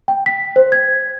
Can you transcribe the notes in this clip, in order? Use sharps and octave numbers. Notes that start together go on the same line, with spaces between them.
G5
B6
C5
G#6